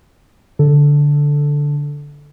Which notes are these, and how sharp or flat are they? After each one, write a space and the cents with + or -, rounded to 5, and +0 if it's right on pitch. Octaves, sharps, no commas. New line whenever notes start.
D3 -10 A4 +0